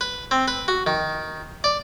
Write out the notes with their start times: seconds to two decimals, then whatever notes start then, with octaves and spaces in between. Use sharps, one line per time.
0.01 B4
0.31 C4
0.48 B4
0.68 F#4
0.87 D#3
1.64 D5